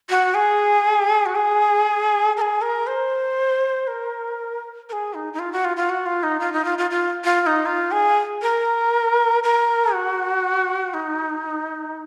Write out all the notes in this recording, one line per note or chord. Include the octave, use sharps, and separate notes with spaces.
F#4
G#4
F#4
G#4
A#4
G#4
A#4
C5
A#4
A#4
G#4
D#4
D#4
F4
F#4
F4
F4
F#4
F4
D#4
F4
D#4
F4
F4
F4
F4
F4
D#4
F4
G#4
A#4
A#4
F#4
D#4